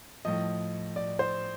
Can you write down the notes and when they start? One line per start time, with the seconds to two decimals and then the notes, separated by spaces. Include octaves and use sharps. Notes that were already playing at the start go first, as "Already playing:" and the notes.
0.25 A2 F3 D#5
0.96 D5
1.19 C5